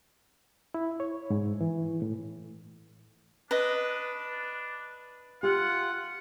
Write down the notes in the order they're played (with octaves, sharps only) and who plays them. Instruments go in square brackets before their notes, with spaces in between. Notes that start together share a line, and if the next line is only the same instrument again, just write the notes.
[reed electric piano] E4
C#5
G#2
E3
A2
[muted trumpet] D4 [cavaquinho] B4 D#5
[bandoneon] F4 [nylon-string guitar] G4 F5 [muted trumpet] F#5